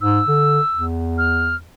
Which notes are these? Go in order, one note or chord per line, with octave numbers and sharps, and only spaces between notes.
G#2 E6
D3
E2
F6